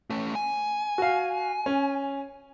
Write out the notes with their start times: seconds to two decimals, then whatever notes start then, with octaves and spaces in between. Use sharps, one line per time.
0.10 A3 C#4
0.35 G#5
0.98 F#4 F5
1.66 C#4